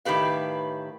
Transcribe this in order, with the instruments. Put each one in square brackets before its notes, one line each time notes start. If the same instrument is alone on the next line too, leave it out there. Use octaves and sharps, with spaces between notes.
[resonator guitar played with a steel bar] A2 D#3 G4 B4 F5